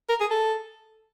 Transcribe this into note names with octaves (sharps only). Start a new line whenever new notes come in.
A#4
G#4
A4